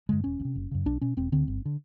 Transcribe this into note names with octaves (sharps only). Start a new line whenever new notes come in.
G2 D3 G#3
E1 C#4
D2
C3
F#1
F#2 C#3
B1 D4
B2 C#4
E1 C4
D2 D3 C4
G1
D3